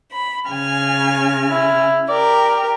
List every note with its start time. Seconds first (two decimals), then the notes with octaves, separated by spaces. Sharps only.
0.12 B5
0.49 C#3 G#5 F6
1.50 E4
2.09 G4 A#4 D5